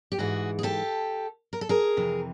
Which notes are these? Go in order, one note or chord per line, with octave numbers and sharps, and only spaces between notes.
G4
G#2 E3 F#4 G#4
G#4
G4 A4
A#4
A4
G#4 A#4
F2 C3 E3